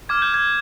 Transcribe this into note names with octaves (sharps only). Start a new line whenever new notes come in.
D6 F6 G#6
G6
G#6